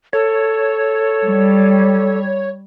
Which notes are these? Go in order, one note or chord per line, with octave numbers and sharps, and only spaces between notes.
A4 C#5
G3